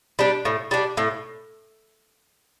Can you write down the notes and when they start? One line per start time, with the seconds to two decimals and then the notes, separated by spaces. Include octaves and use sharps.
0.19 G3 D4
0.45 A2
0.71 G3 D4
0.97 A2